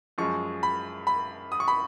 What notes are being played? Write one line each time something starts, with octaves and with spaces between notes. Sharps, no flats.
F#2 F3 G#3 C#6
B5
B5
D#6
C#6
B5